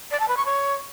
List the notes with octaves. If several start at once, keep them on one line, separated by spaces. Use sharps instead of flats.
D5
A5
B4
C#6
C#5